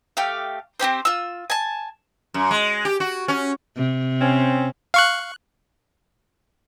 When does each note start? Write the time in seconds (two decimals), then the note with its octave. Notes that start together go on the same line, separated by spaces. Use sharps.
0.17 A3 G4 F5
0.80 C4 C#4 G4 C5
1.05 F4 E6
1.50 G#5 A5
2.34 F#2
2.51 G#3
2.85 G4
3.00 F#4
3.28 C#4
3.77 C3
4.21 C4 C#4
4.94 F5 C#6 F#6